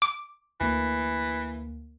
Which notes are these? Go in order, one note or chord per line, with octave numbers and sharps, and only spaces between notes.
D6
D2 E3 A#3